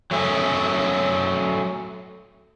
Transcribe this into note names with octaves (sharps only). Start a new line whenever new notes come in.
F#3 A3 C#4 G#4